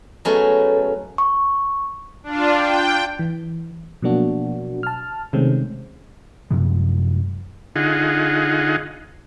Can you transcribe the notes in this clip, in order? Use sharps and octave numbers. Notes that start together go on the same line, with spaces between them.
F#3 G#3 A3 B3 C#4
C#6
D4 F4
G5
E3
B2 F3 F#3 A#3 D4 F#4
A5 F6
C3 D#3 G#3 A3 C4 C#4
F#2 C3 F3 G#3
D3 D#4 F4 G#4 F#5